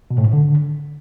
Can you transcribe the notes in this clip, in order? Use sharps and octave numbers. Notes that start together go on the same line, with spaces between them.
B2
A2
G#2
D3